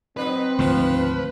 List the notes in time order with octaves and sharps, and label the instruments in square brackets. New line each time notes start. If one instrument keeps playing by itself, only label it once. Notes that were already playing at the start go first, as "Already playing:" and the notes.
[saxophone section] F#3 D#4 [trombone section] C4 [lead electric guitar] B4
[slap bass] D2 G#2 D#3 [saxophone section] F3